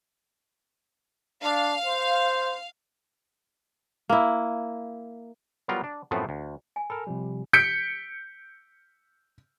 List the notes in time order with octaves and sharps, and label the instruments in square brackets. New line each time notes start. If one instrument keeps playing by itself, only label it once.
[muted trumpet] D4 [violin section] F5
[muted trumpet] C5
[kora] A#3 E4
[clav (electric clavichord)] F#3 G3 B3 F4 A#4
D4
F#2 A2 F3 A3 B3 C4
D2
[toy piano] G#5
[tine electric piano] A4 A#4 [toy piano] B5
[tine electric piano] C3 F3 G3
[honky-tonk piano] G6 B6 C#7 D7